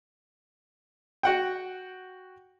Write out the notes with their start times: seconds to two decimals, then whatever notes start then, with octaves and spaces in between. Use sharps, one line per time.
1.23 F#4 F#5 G5